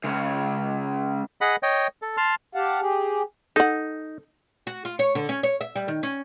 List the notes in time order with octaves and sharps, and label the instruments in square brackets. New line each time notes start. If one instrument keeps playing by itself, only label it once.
[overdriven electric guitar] C#2 C#3
[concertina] G#4 D#5 F#5 B5
C#5 D#5 G5
A4
A5 C6 F6
[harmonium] G4 F5 F#5 A5
G4 G#4
[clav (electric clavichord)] D#4 [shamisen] A4 F#5
[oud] F#4
F4
C#5
D3
C#4
C#5
E5
G3
D#3
C#4